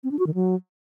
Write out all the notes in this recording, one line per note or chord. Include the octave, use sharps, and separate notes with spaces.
C4
D4
F#4
D#3
F#3